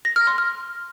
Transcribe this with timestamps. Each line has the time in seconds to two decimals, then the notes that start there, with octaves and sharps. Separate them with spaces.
0.05 A#6
0.16 F6
0.27 C6
0.38 F6